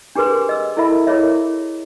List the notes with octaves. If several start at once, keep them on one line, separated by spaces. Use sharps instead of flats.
D4 G4 G#4 A#4 B4 C6
D#5 E6
E4 A4 A#4 D#5 E5 B5
E4 G#4 A#4 C#5 D#5 E5